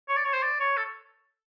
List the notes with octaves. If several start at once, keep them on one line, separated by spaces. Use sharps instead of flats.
C#5
D5
C#5
C5
D5
C#5
A4